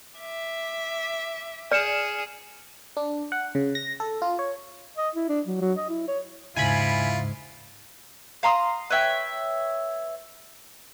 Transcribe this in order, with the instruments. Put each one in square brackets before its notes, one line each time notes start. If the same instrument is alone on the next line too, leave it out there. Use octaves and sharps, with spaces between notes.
[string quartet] E5 D6
[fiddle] G#4 [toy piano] D5 [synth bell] F6 C#7 E7
[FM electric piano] D4
F#5
C#3
A#6
A4
F4
C#5
[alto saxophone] D#5
E4
D4
F#3
F#3
D#5
E4
C#5
[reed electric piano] D#2 C#3 [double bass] G#2 [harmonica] E4 F4 [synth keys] G#5 B5
[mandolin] F5 A#5 C6 D#6
B4 C#5 E5 G5